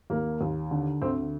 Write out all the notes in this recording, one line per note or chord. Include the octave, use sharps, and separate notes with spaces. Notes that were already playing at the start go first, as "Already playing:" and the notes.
D#2 A#3
D#2
D3
D2 C4